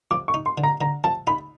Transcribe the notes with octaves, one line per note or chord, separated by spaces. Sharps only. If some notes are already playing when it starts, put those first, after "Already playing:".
F3 D6
C#6
D#4
C6
D3
A#5
D3 A#5
F3 A5
D#4 B5